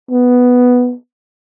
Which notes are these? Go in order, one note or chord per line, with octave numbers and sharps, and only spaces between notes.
B3